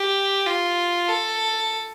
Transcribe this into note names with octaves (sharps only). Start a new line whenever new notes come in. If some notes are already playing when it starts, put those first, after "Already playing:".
Already playing: G4
F4
A4